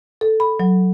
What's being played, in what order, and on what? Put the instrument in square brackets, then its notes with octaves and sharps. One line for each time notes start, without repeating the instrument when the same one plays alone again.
[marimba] A4
B5
F#3